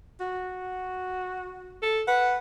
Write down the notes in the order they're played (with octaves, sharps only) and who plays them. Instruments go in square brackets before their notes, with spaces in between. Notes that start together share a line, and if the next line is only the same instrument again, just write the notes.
[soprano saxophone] F#4
[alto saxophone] A4
[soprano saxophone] B4 [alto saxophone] F#5